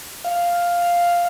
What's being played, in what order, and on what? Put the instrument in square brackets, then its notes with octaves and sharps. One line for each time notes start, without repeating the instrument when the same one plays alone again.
[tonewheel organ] F5